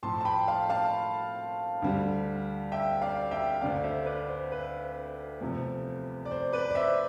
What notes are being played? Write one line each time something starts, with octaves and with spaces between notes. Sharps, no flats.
A2 F3 A3 A5 C6
A5
G5 B5
F5 A5
F5 A5
D2 D3 G3
E5 G5
D5 F5
E5 G5
D2 D3 A3 D5 F5
C5 E5
B4 D5
C5
B4
E2 C3 F3 A3
D5
C5
B4 D5
D5
C5 E5